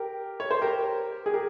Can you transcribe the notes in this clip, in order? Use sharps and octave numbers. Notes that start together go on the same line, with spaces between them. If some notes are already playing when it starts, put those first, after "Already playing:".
Already playing: G4 A#4
C#5
C5
G4 A#4
G#4
G4 A#4